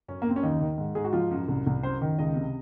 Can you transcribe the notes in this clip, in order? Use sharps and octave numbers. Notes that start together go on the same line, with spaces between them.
F#2 C#4
A#3
F#2 C4
C#4
D#2 D#4
D#3
G#2
G#2 G#4
F#4
F3 F4
F#2
C2
C2
F#2 C5
D#3
C#2 D#5
C3